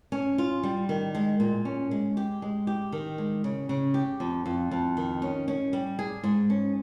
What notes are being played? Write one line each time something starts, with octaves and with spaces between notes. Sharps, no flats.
C#4
F4
G3
D#3
G#3
A#2
C#4
G#3
G4
G#3
G4
D#3
G#3
C#3
C#3
G4
F2
F2
F2
D#3
C#4
C#4
G3
G#4
G#2
C#4